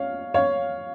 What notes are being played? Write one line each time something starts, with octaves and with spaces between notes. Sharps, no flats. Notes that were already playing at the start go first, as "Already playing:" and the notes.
Already playing: C#5 F5
C#5 F5